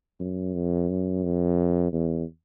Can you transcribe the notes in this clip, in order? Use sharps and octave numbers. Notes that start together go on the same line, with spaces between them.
F#2
F2
F#2
F2
E2